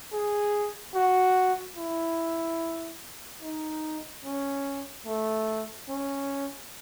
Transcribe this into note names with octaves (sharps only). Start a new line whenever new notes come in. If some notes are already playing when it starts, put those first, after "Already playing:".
G#4
F#4
E4
D#4
C#4
A3
C#4